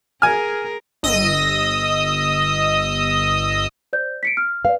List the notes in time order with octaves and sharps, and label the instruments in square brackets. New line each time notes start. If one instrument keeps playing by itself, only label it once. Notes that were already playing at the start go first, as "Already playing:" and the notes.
[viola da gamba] G#4 A#4 [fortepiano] G#5 F6
[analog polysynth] G1 D#5 D#6 E6
[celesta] C5 D5 G6
B6 C#7 D7
F6
[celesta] B4 D5 [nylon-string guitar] F5